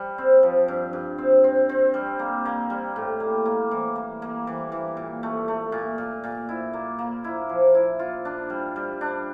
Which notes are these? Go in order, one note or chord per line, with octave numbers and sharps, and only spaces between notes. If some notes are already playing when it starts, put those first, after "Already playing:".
Already playing: G3
C4
F3
G2
G2
C4
C4
C4
G3
A#3
A#3
G3
A2
A#3
A#3
E3
A#3
A#3
E3
E3
A#2
A3
A3
A#2
A#2
A#2
E4
A#3
A#3
E4
F3
E4
F4
D4
G3
G3
D4